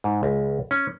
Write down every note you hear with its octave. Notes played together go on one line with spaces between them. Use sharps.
G#2
C#2
C#4